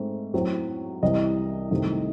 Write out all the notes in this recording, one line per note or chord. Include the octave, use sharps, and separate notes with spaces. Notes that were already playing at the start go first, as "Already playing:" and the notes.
Already playing: G#2 A3 C4
A2 F#3 C4
C2 C3 E3 D#5
C2 C3 D#3 F#3 A3